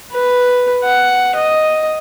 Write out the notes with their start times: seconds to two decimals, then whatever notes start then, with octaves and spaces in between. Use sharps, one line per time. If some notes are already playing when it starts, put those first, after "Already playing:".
0.12 B4
0.83 F#5
1.36 D#5